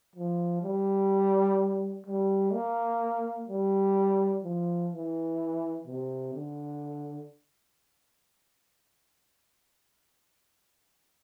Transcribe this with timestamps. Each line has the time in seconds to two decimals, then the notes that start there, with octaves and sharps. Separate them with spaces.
0.16 F3
0.63 G3
2.07 G3
2.53 A#3
3.48 G3
4.43 F3
4.92 E3
5.87 C3
6.34 D3